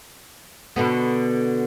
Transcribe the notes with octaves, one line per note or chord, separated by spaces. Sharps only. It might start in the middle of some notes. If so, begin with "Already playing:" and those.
B2 D3 B3